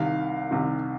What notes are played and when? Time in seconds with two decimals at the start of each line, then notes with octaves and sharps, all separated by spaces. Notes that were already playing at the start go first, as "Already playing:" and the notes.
Already playing: C2 C3 D#3 F5
0.51 C2 C3 D#3